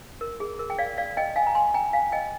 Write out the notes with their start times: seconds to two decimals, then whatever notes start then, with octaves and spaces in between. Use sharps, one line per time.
0.21 A#4
0.40 G#4
0.59 A#4
0.70 G5
0.78 D5 F5
0.98 D5 F5
1.17 D#5 G5
1.36 F5 G#5
1.47 A#5
1.55 G#5 C6
1.74 G5 A#5
1.93 F5 G#5
2.12 D#5 G5